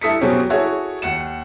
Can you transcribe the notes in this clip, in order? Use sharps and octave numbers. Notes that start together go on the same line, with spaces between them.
G2 E4 A4 D#6 B6 C#7
B2 F#3 G3 C4 C#4 G#4
E4 F#4 G#4 A4 C#5
D#2 F#5 C#7 E7